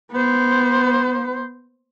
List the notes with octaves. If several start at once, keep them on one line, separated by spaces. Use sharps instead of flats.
B3 C5